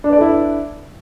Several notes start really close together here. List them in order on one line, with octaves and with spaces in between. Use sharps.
D4 B4 D5 A4 E4